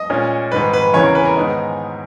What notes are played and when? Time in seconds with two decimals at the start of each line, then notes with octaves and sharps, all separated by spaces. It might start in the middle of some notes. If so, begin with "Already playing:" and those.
Already playing: D#5
0.10 A#2 G#3 C#4
0.52 G#2 D#3 G#3 B4
0.73 B4
0.94 E2 C#3 E3 A#3 C#4 C#5
1.04 A#4
1.15 B4
1.25 A#4
1.37 G#2 D#3 G#3 B3 D#4